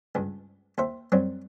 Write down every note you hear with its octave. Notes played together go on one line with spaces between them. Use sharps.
C#2 G2
D#2 C5 E5
F#2 F#3 G3 C4